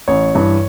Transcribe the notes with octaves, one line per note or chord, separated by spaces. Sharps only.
A1 C#5
G2 E3